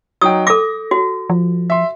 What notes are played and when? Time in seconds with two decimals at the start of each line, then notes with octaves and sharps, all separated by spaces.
0.21 F#3 D#4 G5 D#6
0.47 A4 D6 A#6
0.91 F#4
1.30 F3
1.70 E5 C6